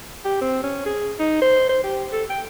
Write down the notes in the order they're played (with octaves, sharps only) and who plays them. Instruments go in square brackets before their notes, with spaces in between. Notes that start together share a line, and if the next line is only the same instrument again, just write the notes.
[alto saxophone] G4
C4
C#4
G#4
D#4
C5
C5
G4
A4
G5